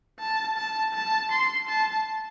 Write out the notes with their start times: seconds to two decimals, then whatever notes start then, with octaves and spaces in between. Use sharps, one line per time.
0.19 A5
0.57 A5
0.94 A5
1.31 C6
1.68 A5